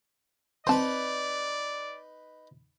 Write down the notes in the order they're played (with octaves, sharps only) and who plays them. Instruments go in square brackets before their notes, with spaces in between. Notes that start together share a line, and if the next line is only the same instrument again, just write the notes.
[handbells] C4 C6 [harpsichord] D#4 B4 [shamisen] C5 A5 [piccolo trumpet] D5